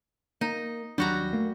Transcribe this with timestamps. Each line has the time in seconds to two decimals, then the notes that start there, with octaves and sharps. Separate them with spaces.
0.41 A#3 D#4
0.98 D#2 F#3 G3 D4 F#4 A#5
1.33 A3 A#3